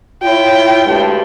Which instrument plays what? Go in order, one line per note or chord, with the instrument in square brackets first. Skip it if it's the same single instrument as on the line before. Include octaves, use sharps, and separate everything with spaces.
[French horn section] E4 F4 C#5 [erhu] G5
[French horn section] D2 G2 G#3